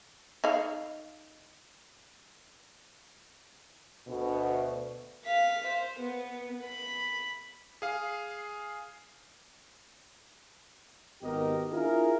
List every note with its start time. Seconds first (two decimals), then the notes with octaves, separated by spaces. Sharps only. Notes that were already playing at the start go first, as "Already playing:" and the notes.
0.44 D#4 F5
4.07 D2 B2
5.25 F5 B6
5.67 C5
6.00 B3
6.65 B5
7.82 G#4 F5
11.22 G#1 D#3 B3 G4 A#4 D#5
11.71 D4 E4 F4 G#4 A#4